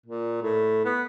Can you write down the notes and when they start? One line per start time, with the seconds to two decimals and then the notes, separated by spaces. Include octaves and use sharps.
0.06 A#2
0.43 A2
0.85 B3